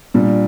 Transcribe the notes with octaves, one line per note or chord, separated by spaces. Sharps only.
A#2 G3 D4